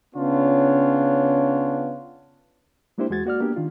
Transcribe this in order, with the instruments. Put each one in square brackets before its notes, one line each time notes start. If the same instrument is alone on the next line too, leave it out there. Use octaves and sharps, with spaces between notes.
[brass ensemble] C#3 B3 C#4 D4 F4 C#5
[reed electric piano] G#3 A#3 D4 E4 G4 C5
E2 G#3 F#4 G#6 A6
A#3 F#4 D5 F6
A#3 B3 D4 G4
D#3 D4 F4